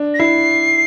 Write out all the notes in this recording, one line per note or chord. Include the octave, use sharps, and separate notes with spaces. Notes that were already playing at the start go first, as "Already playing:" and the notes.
Already playing: D4
A#6
E4 C7